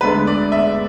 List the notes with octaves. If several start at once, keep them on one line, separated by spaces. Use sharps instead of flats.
D2 D3 G#3 B3 B4
D5
E5